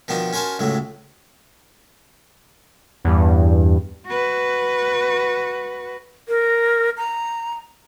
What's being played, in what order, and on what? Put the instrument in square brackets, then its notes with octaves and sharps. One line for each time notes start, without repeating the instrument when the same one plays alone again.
[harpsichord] B2 D#3 F3 D4 D#4
C#4 F#4 A#4 C5 G#5 A5
C#2 A2 F#3 A3
[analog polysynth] E2 G2
[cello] F#4 B4
[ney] A#4
A#5